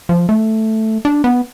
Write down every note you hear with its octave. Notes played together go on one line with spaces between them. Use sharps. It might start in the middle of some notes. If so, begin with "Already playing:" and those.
F3
A3
D4
B3